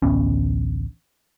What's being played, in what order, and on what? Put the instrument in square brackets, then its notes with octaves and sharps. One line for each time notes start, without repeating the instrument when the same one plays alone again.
[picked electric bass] A1 D2 B3 C#4